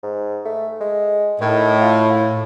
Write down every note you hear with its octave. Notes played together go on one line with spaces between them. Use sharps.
G#2
A3
G#3
A2 D#3
F4
A3